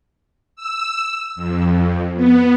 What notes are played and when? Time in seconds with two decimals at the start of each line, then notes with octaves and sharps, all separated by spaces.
0.56 E6
1.36 F2
2.16 B3